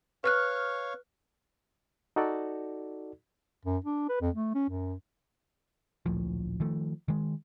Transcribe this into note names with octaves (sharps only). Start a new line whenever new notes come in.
B4 C#5 F5 C#6 F6 F#6
D#4 F#4 A4 D5
F#2
D4
B4
F2
A3
C#4
F#2
D1 A#1 A2 F3
D#3 F3 A3
D#3 G#3